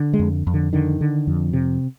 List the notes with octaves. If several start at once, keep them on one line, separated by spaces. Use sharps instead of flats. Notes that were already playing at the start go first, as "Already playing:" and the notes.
Already playing: D3
G#3
F2
F2
D3
D3 D#3
D3
F2
C3